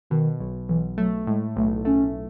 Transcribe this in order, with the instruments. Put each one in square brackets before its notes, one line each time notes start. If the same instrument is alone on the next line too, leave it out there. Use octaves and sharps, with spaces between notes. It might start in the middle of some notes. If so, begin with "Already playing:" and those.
[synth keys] B2 [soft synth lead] D#3
[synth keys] B1
[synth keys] B1 [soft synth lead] E3
[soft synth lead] F#3 [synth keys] A3
[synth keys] A2 [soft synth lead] G#3
[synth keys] B1 [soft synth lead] A3
[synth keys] A3 [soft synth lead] C#4